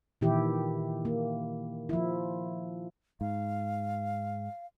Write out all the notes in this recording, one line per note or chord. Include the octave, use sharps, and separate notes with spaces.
A#2 D#3 E3 E4 G4
A#3
F3 E4
G#2 F5